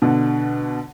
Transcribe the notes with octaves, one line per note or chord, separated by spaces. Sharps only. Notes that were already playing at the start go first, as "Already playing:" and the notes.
B2 D3